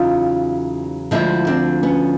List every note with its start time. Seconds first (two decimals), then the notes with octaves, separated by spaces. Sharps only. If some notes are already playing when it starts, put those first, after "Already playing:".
Already playing: E2 C#3 F#3 D#4 F4
1.11 D2 D3 F3 G#3 D4 E4
1.47 C4 D4
1.83 B3 C#4